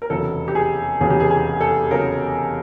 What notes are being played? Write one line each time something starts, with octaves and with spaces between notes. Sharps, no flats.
A#4
F1 E2 C#3 F#3 A4
G4
G#4
F1 E2 C#3 F#3 G#4
G4
G#4
G#4
A4
C#3 F#3 A#4